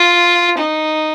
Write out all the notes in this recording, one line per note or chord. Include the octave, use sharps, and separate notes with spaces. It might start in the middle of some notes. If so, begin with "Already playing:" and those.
Already playing: F4
D#4